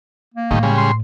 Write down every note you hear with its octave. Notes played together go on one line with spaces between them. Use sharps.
A#3
A2 D#3 G3 A3
C#3 G3 G#3
C6